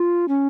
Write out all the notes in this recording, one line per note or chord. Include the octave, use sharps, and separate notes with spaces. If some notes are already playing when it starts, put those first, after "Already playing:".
Already playing: F4
C#4